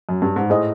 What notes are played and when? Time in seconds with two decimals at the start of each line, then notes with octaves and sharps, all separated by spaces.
0.09 F#2
0.22 G2
0.36 G#2
0.50 A2 G#4 C5 D#5